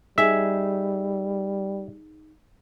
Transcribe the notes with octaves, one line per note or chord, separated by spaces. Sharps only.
G3 D#4 G#4 E5